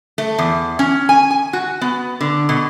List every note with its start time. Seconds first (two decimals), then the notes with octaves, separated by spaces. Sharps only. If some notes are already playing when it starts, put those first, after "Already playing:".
0.18 A3
0.38 E2
0.79 C#4
1.09 G#5
1.30 G#5
1.53 F#4
1.81 B3
2.21 D3
2.49 B2